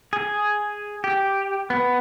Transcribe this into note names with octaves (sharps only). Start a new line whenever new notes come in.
G#4
G4
B3